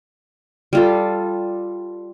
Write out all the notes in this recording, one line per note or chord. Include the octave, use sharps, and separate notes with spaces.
G3 F4 A4